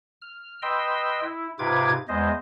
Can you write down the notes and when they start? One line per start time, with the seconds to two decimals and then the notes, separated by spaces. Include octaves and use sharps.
0.21 F6
0.62 B4 D#5 G5 C6 E6
1.21 E4
1.59 G#2 C3 F4 B4 D6 G#6
2.08 E2 G#3 C5 D#5